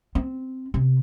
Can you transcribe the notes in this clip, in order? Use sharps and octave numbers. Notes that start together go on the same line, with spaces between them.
C4
C3